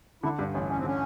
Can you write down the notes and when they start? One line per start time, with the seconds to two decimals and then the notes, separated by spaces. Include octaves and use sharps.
0.23 D3 E4
0.39 G2 D4
0.54 A1 C#4
0.69 A1 C#4
0.77 C4
0.84 D3 C#4